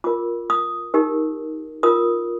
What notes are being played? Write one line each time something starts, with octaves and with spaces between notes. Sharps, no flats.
F4 A#4 D6
D#6
D#4 G4 A#4
F4 A#4 D#6